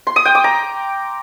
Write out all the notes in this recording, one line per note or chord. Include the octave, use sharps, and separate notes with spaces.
C6
D#6
G5
D6
A#5